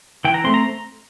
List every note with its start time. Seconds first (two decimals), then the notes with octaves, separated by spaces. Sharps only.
0.25 E3 G5
0.34 A#5
0.44 A3 C4 C6
0.54 A#5